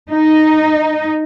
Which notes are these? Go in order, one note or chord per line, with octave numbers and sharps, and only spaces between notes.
D#4